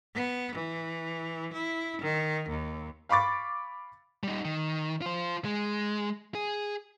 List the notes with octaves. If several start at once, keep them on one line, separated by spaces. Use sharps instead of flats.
B3
E3
E4
D#3
D#2
F5 B5 C#6 D6 A6
G3 D#4
D#3
F4 C5
G#3
G#4